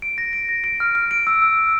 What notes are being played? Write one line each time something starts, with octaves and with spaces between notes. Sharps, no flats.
D7
A#6
D7
A#6
D7
F6
F6
D7
E6
E6
E6